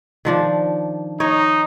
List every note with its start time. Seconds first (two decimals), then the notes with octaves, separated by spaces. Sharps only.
0.25 D#3 F3 D4
1.20 D#4 C#5